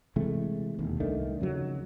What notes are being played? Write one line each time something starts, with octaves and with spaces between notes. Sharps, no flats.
C3 E3 G#3 A3
E1 D#2
C2 D#3 A3 D4
F2 C#3 F#3